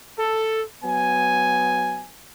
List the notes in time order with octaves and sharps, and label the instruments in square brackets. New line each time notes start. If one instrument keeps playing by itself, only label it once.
[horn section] A4
F#3 B3 G#5